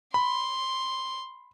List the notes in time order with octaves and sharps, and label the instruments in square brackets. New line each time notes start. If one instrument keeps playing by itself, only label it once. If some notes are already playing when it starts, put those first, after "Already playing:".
[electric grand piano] B5 [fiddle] C6